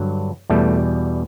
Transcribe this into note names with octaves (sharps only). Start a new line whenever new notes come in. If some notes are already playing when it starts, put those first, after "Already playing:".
Already playing: G2 D3 F#3
E2 B2 G3 A3